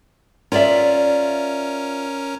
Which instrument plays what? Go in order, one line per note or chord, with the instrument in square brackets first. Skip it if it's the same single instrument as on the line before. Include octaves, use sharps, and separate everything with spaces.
[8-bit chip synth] C#4 A#4 [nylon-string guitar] F4 D5 E5